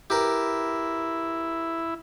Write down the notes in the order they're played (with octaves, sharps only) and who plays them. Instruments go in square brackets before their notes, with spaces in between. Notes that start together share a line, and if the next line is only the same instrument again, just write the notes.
[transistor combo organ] E4 [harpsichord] G4 A#4 B4